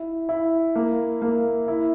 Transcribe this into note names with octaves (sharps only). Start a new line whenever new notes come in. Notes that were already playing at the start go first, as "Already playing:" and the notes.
Already playing: E4
E4
A#3
A#3
E4